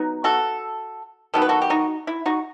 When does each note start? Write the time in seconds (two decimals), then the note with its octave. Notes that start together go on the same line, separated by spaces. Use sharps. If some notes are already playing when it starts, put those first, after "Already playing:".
Already playing: F#3 B3 D#4
0.24 F#4 A4
1.34 D#3 F#3 B3 A4
1.42 B4
1.49 F#4 A4
1.61 G4
1.70 D#4 F#4
2.07 E4
2.26 D#4 F#4